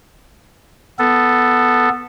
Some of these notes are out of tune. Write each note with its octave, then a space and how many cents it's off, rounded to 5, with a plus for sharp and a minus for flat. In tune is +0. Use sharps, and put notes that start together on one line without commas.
B3 +0 A4 +0